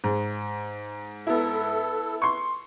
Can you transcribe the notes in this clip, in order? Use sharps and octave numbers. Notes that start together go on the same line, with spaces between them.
G#2
B3 E4 A4
C6 C#6